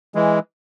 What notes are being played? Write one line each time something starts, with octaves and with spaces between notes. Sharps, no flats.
E3 G#3